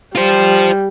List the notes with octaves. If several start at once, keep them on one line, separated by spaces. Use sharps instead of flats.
G3 F4 C5